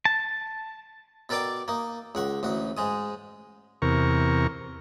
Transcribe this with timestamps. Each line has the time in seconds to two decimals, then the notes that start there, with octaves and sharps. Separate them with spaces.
0.05 A5
1.29 B2 A4 A#4 D5 G5 D6
1.68 A#3 D#4
2.15 C#2 F#5 C#6
2.43 A1 D2 F#4
2.77 G#2 G#3 D#6
3.82 E2 C3 A#4 C#6